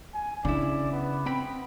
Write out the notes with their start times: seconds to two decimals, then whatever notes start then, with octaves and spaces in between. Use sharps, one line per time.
0.14 G#5
0.45 C#3 D4 E4 D5
0.92 B3
1.26 C4 G5 B5